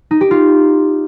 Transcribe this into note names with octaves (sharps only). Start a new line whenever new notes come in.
D#4
G4
F4